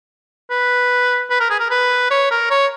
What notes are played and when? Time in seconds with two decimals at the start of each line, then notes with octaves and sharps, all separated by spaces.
0.50 B4
1.30 B4
1.40 A#4
1.50 G#4
1.60 A#4
1.70 B4
2.11 C#5
2.31 A#4
2.51 C#5